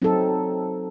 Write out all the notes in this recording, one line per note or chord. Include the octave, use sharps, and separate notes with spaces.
F#3 C4 D#4 A4